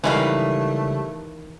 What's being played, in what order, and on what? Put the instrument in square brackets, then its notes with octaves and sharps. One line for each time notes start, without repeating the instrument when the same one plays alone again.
[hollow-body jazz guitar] C#2 G3 [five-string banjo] D#3 E3 [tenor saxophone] A3 [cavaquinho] B4 D#5 F5